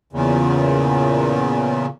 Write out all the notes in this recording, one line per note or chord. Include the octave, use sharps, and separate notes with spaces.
E2 A#2 C#3